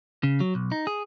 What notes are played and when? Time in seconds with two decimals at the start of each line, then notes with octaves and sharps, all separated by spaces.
0.23 C#3
0.40 F#3
0.55 B1
0.72 D#4
0.87 G#4